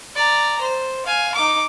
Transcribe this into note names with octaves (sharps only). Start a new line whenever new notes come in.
D5 A#5
C5
F5 G#5
D#4 D6